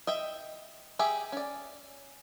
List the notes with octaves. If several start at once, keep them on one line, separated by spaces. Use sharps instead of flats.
D#5 E5 G5
G4 G#4 E5
C#4 D5